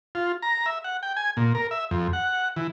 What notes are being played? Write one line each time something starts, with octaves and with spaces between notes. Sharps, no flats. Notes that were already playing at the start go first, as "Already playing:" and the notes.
F4
A#5
E5
F#5
G5
G#5
A#2
A#4
E5
F2
F#5
E3